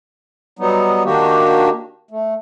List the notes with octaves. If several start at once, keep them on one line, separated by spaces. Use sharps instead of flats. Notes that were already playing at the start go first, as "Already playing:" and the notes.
F#3 G3 B3 D#4
D#3 A#3 D4 F#4 G4
A3